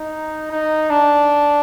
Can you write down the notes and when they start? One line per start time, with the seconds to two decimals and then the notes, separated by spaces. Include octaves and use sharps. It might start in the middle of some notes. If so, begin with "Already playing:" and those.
Already playing: D#4
0.51 D#4
0.90 D4